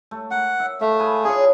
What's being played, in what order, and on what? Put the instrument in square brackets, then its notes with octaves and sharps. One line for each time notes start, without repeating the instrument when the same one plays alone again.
[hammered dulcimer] A3
[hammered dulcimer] A#4 [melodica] F#5
[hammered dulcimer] E5
[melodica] A3 [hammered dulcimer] F5
[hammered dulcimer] G#4 B4
[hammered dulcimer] D4 F4 C#5 [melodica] G#4